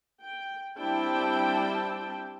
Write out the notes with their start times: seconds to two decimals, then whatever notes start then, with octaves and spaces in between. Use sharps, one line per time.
0.22 G5
0.80 G3 C4 D4 E4 G5 A5